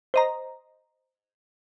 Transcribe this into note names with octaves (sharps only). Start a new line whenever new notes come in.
C5 D#5 A#5